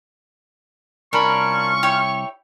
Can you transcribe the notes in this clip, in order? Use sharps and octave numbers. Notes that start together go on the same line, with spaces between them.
C2 C#4 D4 F4 A#4 G#5 B5 C#6
E4 G4 C#5